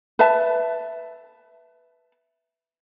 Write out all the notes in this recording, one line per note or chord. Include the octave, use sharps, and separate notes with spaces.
B4 E5 A5